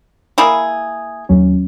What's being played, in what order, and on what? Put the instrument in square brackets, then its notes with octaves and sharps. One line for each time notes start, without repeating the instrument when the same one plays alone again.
[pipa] A#3 E4 G#4
[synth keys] D#2 F#3 C#4